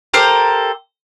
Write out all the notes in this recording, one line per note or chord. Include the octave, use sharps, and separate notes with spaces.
G4 A4 A#4 C5